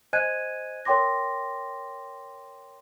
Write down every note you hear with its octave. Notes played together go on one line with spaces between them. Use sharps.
C5 D#5 G#5 F#6 G#6 D#7
A#4 C#5 G5 C6 D6 A#6